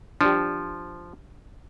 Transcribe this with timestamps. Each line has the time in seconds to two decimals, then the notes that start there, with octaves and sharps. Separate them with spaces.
0.21 F3 D4 G4